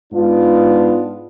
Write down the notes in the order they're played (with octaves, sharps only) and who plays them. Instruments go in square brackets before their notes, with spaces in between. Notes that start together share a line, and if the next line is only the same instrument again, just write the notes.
[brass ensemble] G#2 G#3 B3 D4 F4